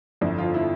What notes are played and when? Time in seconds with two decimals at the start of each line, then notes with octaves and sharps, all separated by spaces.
0.21 G1 F2 D3 E4
0.38 F3 F4
0.54 E4